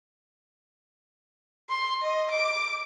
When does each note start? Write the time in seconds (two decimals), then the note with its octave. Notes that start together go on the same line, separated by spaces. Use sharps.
1.70 C6
2.02 D#5
2.31 D6